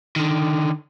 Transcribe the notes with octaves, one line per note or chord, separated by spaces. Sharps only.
D3 D#3